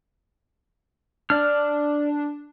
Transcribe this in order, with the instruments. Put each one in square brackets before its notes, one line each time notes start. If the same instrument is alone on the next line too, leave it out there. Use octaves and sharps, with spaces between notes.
[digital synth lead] D4 [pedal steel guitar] D5 F6